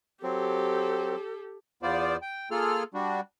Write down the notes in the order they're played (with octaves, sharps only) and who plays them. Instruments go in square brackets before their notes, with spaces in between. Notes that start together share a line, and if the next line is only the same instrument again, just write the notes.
[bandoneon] F#3 C4 [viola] G4 A4
[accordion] E2 B3 F4 C5 D5
G5
A#3 F4 G#4 A4 F6
G3 D4 F#4